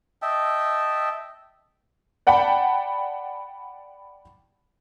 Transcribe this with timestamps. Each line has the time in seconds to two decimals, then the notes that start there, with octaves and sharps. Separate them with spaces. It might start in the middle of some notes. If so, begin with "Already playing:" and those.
0.22 D#5 E5 G5 A5
2.27 D5 F#5 G5 A5 B5